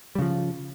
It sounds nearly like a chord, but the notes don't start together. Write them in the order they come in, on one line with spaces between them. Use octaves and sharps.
G3 C#3 F3